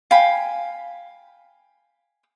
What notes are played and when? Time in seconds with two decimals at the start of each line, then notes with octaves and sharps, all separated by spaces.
0.11 F5 G5 G#5 B5